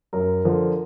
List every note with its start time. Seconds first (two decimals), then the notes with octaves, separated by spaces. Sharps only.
0.13 F#2 A#4
0.45 D3 F3